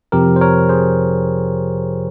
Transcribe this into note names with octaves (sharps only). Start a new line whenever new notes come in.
F2 C3 F3 G4 A#4
C5
A#4 C#5
G#4 C5